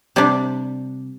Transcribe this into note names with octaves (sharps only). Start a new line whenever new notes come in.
C3 G3 D4